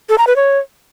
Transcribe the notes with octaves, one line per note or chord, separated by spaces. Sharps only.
A4
A#5
B4
C#5